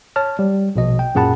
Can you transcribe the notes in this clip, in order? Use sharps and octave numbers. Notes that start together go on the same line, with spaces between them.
C#5 A5 F6
G3
A#1 B2 D#5
G5
F#2 A#2 G#4 F#5 A5 B5